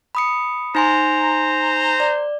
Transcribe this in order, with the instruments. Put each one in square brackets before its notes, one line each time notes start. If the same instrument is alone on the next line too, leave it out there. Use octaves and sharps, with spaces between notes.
[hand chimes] B5 D#6 C#7
[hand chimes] D#4 G#5 C6 [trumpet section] C5 A#5
[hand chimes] D5